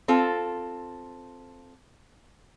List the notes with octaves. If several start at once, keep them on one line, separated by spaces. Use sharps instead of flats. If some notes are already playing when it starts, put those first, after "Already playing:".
C4 F4 A4